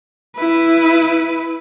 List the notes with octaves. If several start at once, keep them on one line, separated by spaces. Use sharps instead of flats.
E4 B4